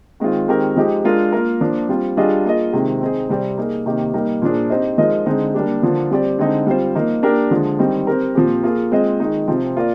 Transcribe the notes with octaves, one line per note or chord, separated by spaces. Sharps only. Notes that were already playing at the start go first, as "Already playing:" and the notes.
D#3 G#3 C4 F4
D#3 G#3 C4 G4 A#4
F3 G#3 D#4 G4
G#3 D4 F4 A#4
A#3 F4 A#4
F3 A#3 D4
G3 C4 F4
G3 D4 F4 G#4 D#5
A#3 F4 G#4 D#5
C3 D#3 G#3 C4
C4 D#4 G#4
C3 G3 C4 G4 D5
A#3 D#4 G#4
C3 D#3 A#3 D#4 G4
G3 A#3 D#4
A#2 F3 A#3 D4 G#4
C4 D#4 G4 C5 D#5
F3 G#3 D#4 A#4 D#5
D3 G#3 C4 D#4
G3 A#3 D4 G4
D3 F3 A#3 D4 F4
G3 C4 G4 D5
D3 G#3 C4 D#4
G3 C4 F4 C5
F3 A#3 D#4
A#3 D4 G4 A#4
D3 F3 G#3
D#3 G3 C4 D#4
C4 G4 A#4
A#2 F3 C4 G4
A#3 F4 G#4
G#3 C4 F4 C5 D#5
D#3 G#3 D#4
C3 F3 C4
A#3 F4 A#4 D5